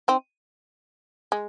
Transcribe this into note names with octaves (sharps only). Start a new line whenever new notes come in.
C4 D#4
G#3